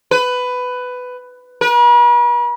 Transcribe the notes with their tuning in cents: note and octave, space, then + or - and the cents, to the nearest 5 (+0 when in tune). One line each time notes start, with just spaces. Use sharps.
B4 +15
B4 -45